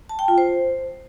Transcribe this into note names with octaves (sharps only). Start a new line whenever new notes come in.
A5
G5
F4
C5